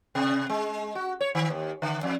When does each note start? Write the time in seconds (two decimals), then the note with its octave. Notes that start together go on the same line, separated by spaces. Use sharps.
0.15 C3
0.49 G#3
0.95 F#4
1.21 C#5
1.35 D#3
1.50 D#2
1.82 D3
2.03 F2